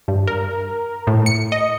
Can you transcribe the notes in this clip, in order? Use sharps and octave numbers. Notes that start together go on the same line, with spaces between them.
G2
A#4
A2
C#7
D#5